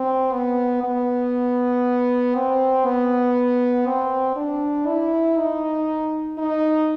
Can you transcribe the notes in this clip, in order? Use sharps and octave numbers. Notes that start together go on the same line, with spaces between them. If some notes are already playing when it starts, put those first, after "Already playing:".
Already playing: C4
B3
B3
C4
B3
C4
D4
E4
D#4
D#4